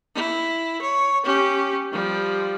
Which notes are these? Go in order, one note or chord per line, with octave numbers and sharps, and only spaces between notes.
E4
C#5
C#4 G4
F3 G3